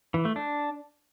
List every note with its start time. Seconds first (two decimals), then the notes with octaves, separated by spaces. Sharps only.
0.14 E3
0.25 A3
0.36 D4